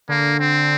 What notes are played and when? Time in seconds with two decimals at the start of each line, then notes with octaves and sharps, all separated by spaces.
0.09 D3 A#3
0.40 C4